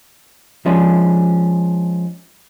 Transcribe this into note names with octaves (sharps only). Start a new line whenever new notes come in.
F3 G#3 C#4 D4